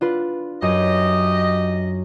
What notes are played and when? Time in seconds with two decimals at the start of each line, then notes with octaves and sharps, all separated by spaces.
0.01 D4 F4 B4
0.62 F#2 G4 D#5